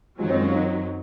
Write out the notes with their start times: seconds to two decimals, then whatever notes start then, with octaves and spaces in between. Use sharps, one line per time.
0.19 F#2 D#3 F3 F#3 G#3
0.29 G#3 C4
0.41 A#3 C#4
0.47 F4
0.52 C4 D#4